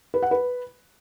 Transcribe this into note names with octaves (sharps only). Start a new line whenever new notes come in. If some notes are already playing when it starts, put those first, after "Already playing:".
B4
F#5
B4